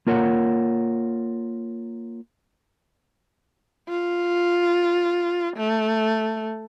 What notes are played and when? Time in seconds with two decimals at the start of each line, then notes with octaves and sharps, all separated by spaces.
0.07 A#3 F4 A#4 C#5 F#5
3.89 F4
5.57 A3